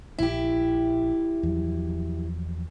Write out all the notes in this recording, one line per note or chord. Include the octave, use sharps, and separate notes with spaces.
A#1 E4 G4
E2 F3 F#3